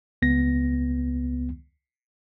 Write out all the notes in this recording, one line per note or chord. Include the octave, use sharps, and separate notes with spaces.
C#2 B3 A#6